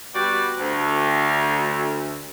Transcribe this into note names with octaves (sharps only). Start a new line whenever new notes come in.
G3 B3 F#4 D5
D2